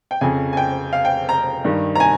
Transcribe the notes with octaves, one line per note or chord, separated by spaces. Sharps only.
G5
F2 C#3 G#5
G#5
G5
F5
G5
A#5
G2 D#3
A#5
G#5